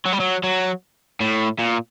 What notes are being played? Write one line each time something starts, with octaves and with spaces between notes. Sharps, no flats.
F#3
G3
F#3
F#3
A2
A#2